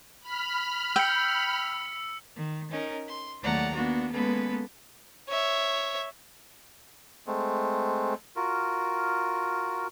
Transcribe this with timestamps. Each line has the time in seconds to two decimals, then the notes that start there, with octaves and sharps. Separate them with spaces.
0.21 B5 F6
0.96 G5 E6 C#7
2.35 D#3
2.71 C#4 D#4 A#4
3.08 C6
3.42 D#2 F#3 A3 D5 F#5 A#5
3.74 A#3 B3 D4 F#4
4.12 G#3 A#3 B3 C#4 A4 B4
5.29 C#5 E5
7.27 G#3 A3 C4
8.36 F4 F#4 A#4